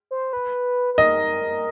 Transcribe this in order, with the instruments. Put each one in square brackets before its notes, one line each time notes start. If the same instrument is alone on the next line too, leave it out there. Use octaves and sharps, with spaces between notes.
[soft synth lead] C5
B4
B4
[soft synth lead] A#4 [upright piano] D#5